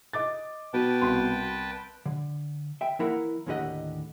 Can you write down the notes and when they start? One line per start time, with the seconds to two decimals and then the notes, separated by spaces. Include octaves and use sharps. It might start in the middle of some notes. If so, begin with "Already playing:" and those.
0.13 D#5 D6 A6
0.74 B2 B4 G5 A5
1.02 C2 B5 C6
2.06 D3
2.81 E5 G5
2.99 E3 A#3 E4 A#4 F#5
3.47 D#2 A2 D3 G4 D#5 F#5